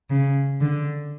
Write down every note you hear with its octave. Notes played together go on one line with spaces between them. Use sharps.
C#3
D3